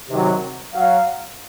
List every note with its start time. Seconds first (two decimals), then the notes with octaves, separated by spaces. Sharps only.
0.10 C3 D#3 F#3
0.74 F#3 F5